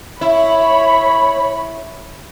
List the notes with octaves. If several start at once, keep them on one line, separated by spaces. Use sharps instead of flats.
E4 C#5 B5